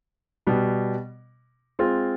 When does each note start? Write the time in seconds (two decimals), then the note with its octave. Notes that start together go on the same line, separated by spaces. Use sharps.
0.47 B2 G3 B3
1.79 G#3 C4 F4